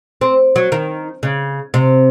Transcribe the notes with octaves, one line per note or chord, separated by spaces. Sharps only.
C4
F#3
D#3
C#3
C3